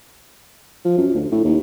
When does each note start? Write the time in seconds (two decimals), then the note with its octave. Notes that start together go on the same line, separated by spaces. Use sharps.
0.85 F3
0.98 F#2
1.14 D2
1.32 A2
1.45 D#2